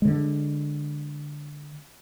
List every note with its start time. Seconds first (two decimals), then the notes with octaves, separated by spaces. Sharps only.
0.02 D3 G#3